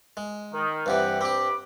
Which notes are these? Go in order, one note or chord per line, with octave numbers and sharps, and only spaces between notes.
G#3
D#3
G2 C3 E3 G4 F#5
G2 C4 G4 B5 D6